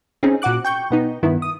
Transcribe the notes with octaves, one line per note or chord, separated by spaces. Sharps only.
C4 C#4 D#4 G#4
A#2 F#4 F#5 D6 F#6
G5 C#6 G6
B2 B3 D#4
G2 D#3 B3 E4
D#6